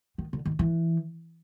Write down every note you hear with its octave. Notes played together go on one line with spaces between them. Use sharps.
D#3
D3
D#3
E3